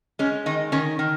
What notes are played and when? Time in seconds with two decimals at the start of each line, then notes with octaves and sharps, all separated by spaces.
0.19 G#3 C#4
0.46 D#3 D#4
0.72 D#3 C#4
0.99 D#3